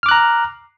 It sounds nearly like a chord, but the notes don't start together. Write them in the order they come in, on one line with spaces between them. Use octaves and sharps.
F6 D6 F#6 A#5